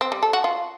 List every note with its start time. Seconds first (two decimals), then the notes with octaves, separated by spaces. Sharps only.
0.01 C4
0.12 G3
0.23 A4
0.33 F#4
0.44 F4